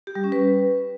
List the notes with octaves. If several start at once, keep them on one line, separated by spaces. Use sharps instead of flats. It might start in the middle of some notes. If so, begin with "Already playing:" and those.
G4
G3
C#4
B4